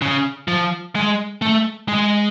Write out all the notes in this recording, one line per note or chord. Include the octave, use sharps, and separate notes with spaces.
C#3
F3
G#3
A3
G#3